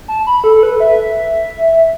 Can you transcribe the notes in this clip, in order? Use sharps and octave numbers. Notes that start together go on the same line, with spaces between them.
A5
B5
A4
A4
B4
E5